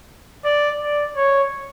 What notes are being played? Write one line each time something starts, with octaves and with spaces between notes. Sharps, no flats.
D5
D5
C#5